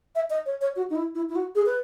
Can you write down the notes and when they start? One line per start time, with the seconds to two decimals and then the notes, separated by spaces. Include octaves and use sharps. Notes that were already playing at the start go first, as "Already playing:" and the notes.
0.15 E5
0.30 D#5
0.46 C#5
0.61 C#5
0.76 F#4
0.90 D#4
0.95 E4
1.15 E4
1.29 E4
1.36 F#4
1.55 G#4
1.66 B4